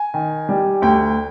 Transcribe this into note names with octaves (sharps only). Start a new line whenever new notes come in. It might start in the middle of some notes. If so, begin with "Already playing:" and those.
Already playing: G#5
D#3
G3
D2 G5